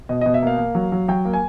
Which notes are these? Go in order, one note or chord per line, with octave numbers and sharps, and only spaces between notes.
B2 D#5
B2 D#5
E5
A#3 F5
A#3
F#3
F#3
F#3 G5
A#3
G#5